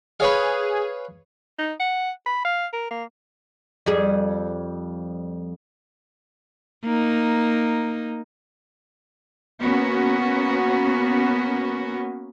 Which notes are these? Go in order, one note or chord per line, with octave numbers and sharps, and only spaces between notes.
G#4 B4 C#5 F5
D#4
F#5
B5
F5
A#4
A#3
F2 G3 G#4
A#3 D#4
A#3 B3 C#4 F#4